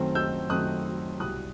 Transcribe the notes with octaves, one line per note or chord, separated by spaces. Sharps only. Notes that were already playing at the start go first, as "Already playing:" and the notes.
Already playing: F#2 D#3 A3 C4
E6 G6
F#2 D#3 A3 C4 D#6 F#6
C2 B2 G3 D#6 F#6